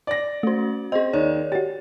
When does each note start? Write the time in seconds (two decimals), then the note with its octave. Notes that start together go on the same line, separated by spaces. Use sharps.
0.07 D5 A#6
0.43 A3 C#4 F#4 C5
0.92 C4 G#4 D#5
1.13 D#2 C#5 D5
1.52 F#4 G4 A6